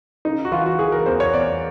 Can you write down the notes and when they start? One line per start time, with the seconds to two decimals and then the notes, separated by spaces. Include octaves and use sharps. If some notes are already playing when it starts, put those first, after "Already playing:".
0.25 C#3 D#4
0.45 F#4
0.52 E3 F4
0.66 F#4
0.79 E3 G#4
0.92 A#4
1.06 E2 C5
1.20 C#5
1.33 E2 D5